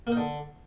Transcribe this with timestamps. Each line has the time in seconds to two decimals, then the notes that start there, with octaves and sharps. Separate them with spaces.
0.07 A#3
0.12 D#4
0.17 D3